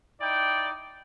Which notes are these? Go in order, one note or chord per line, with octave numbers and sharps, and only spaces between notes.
D#4 E4 D5 G5